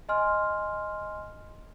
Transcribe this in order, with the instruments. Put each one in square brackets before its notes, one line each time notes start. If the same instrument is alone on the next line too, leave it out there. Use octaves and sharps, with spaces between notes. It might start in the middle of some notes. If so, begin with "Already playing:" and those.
[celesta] D#5 G#5 C6 F6